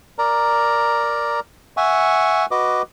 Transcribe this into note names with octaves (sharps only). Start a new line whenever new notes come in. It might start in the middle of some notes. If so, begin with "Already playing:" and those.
A#4 D5 A#5
E5 F#5 G#5 C#6
F#4 B4 D#5 D6